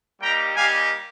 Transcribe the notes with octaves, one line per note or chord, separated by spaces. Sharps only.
G3 A#3 D#4 G4 G5 A#5
G3 A#3 D#4 G4 F5 G#5